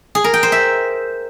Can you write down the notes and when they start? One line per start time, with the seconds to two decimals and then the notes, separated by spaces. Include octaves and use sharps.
0.15 G#4
0.24 A#4
0.34 G5
0.43 C5
0.52 E5